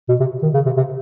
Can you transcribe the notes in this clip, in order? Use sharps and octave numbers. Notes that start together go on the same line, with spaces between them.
B2
C3
D#3
C#3
C3
C3